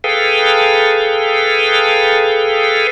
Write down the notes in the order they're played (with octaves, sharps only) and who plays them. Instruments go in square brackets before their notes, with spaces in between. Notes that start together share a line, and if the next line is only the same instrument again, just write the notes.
[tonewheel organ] G#4 A4 B4 F5 G5